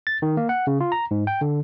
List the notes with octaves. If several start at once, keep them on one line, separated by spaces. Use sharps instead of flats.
A6
D#3
A#3
F#5
C#3
F4
A#5
G#2
G5
D3